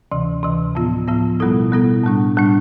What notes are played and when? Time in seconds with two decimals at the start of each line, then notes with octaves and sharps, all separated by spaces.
0.12 D2 C3 E3
0.43 D2 C3 E3
0.75 A2 F3 B3 F4
1.08 A2 F3 B3 F4
1.40 B2 G3 B3 E4 A4
1.72 B2 G3 B3 E4 A4
2.04 A2 G3 D4
2.37 A2 G3 D4